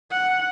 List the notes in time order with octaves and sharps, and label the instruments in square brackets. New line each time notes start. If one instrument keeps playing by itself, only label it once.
[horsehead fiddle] F#5